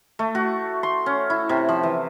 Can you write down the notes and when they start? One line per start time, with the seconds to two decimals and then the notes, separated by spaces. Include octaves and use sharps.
0.19 A3
0.35 F#4
0.83 C6
1.06 C#4
1.30 E4
1.49 C3
1.69 F3
1.83 E3